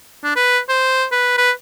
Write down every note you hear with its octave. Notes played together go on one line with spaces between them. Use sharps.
D4
B4
C5
B4
B4